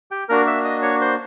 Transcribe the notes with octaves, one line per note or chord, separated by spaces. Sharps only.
G4 G5
A#3 D4 F#4 A#4 A#5
E5 E6
D#5 D#6
C#5 C#6
C5 C6